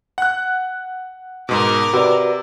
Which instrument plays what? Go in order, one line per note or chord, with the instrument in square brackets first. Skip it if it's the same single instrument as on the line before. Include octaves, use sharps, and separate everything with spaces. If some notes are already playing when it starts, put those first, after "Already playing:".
[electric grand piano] F#5 F#6
[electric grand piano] G#2 B2 [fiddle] A#4 D6
[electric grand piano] C3 [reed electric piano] F#4 B4 D5